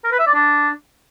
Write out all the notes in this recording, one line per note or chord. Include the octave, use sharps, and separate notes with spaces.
A#4
B4
E5
D5
D4